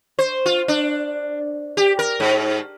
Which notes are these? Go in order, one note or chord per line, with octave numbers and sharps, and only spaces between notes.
C5
F4
D4
G4
A#4
G#2